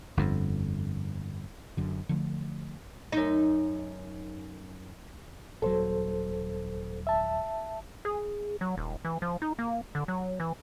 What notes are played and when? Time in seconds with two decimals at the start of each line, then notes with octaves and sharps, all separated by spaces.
0.17 G1 F2
1.77 F#1 F#2 D3
2.09 D3 F3 G3 A3
3.12 F#2 D#4
5.62 D#1 F#3 A4 C5
7.07 E5 A5
8.05 G#4
8.61 F#3
8.78 D#1
9.05 E3
9.22 F3
9.42 D#4
9.59 A#3
9.95 D3
10.08 F#3
10.40 E3